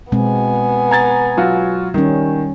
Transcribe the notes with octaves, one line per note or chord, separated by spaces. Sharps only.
B2 G#3 B3 C4 G#5
A#5 G#6 A6
F#3 F4 F#4
D#3 G3 C#4